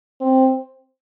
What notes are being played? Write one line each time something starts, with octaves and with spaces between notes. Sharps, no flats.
C4